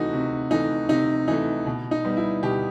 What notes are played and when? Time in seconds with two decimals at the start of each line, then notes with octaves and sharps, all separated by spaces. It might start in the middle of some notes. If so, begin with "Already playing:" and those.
Already playing: C3 E3 A3 D#4 F#4
0.13 C3
0.51 E3 A3 D#4
0.89 C3 D#4
1.28 E3 A3 D#4
1.66 B2
1.91 D#4
2.05 G3 B3
2.17 E4
2.43 B2 G4